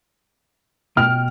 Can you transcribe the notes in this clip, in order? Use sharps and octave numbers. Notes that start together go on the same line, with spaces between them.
B2 G5 F6